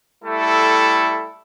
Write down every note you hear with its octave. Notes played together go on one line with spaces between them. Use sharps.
G3 A3 E4 A4